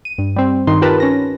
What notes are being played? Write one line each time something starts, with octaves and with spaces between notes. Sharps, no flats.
D#7
G2
G3 C4
G2 D#3 D#4 C6
F4 G4 A#4 B4 A5
C#4 A#6